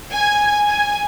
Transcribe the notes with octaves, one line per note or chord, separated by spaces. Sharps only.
G#5
G#5